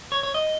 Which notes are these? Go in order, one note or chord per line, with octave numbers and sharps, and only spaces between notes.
C#5
C#5
D#5